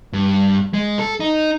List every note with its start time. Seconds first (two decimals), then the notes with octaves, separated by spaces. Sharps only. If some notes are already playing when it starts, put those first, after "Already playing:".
0.13 G2
0.73 G#3
0.99 A4
1.20 D#4